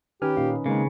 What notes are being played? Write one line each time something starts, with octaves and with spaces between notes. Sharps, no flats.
D#3 C#4 D#4 G4 B4 G#5 F6
A#2 C#4 D#4 F5
C#3 G#3 A#3 C4 D#4